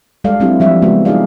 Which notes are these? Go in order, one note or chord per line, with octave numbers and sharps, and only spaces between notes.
G3 G#3 A4 D5 F5
F#3 G3 C4 D4 E4 G4
F3 G3 E5
C#3 G#3 B3 F#4
D#4 F4 G4 G#4 D5 F5